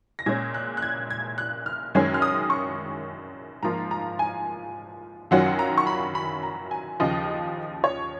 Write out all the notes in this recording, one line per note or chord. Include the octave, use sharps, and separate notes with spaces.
A#6
A#2 G#3 C#4 G#6
F#6
F#6
G#6
G#6
F#6
F6
F#2 D#3 G#3 C#4 G#6
F6
D#6
C#6
G#2 F3 A#3 F4 A#5
A#5
G#5
F#2 D#3 F#3 C#4 F4 F#5
A#5
C#6
B5
B5
A#5
G#5
D#2 C#3 F3 D#5
C#5